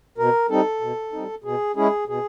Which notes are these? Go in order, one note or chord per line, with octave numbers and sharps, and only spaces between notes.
B2 A#4
G3 C4 D#4 A4
B2
G3 C4 D#4
B2 G#4
G#3 C#4 E4 G#4
B2 G#4